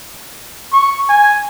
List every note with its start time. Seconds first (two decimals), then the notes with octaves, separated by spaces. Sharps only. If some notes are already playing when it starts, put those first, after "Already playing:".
0.73 C#6
1.09 G#5